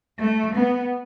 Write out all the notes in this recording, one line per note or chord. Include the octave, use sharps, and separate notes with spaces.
A3
B3